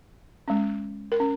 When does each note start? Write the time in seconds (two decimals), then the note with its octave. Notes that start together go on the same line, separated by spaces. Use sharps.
0.48 G#3 C#4
1.12 A#4
1.20 C#4